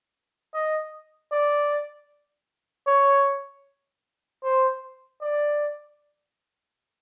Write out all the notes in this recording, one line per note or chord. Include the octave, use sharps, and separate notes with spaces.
D#5
D5
C#5
C5
D5